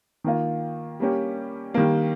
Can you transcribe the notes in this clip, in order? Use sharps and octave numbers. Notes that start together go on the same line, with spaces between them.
D#3 A#3 F4
G3 A#3 C#4 G4
D#3 G3 A#3